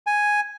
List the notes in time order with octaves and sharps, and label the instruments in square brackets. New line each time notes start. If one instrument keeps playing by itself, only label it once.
[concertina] G#5